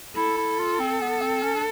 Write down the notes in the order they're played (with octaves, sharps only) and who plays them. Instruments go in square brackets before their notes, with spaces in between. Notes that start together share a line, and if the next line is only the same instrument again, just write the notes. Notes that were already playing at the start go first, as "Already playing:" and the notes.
[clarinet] E4 [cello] A4
[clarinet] E4
F4
C4
B3
C4
C#4
D4